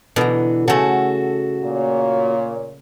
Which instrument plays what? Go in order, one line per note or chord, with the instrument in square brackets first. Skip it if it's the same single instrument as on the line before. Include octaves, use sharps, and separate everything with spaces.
[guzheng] B2 A#5 [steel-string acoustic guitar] D3 E3
[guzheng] C#3 A3 [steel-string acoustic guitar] F#4 A4
[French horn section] A#2 C#5